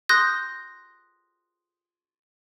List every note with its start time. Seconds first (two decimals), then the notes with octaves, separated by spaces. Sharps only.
0.09 C6 D#6 F#6 G6 A#6